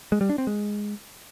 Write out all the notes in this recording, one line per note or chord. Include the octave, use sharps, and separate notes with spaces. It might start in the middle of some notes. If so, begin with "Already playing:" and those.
G#3
G3
D4
C4
G#3